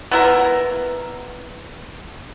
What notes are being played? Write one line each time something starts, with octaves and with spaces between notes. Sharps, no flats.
B3 E4 A#4